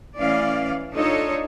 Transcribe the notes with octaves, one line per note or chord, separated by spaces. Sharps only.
E3 A3 C#4 D5 F5
D4 D#4 F4 A4 C#5 D#5